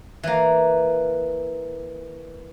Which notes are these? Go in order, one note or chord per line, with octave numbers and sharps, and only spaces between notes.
E3 A#3